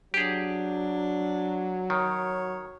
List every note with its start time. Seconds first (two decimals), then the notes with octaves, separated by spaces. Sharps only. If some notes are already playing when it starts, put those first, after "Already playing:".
0.14 F#3 D4 G4 G#4
1.90 D#3 C#5